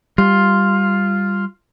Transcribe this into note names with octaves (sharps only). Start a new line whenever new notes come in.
G3 F4